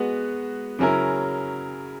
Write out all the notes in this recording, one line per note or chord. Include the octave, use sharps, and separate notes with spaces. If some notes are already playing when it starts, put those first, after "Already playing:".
Already playing: G#3 B3 F#4 B4
C#3 F#3 C#4 E4 A#4